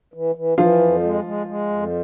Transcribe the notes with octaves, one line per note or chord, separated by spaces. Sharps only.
E3
E3
E3 F3 F4
F2
G#3
G#3
G#3
F2